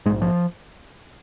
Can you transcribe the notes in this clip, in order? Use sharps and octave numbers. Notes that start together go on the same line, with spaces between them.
A#1 G#2 G#3
F3